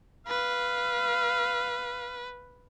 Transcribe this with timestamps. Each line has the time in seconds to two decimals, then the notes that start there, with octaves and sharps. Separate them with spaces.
0.28 B4 F5